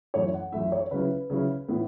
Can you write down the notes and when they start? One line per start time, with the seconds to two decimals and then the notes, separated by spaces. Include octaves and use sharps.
0.14 F#2 E3 A3 E4 C#5
0.34 F#5
0.52 F#2 E3 A3 E4 E5
0.72 C#5
0.91 C#3 F#3 C#4 E4 B4
1.30 C#3 F#3 C#4 E4
1.68 A2 E3 B3 E4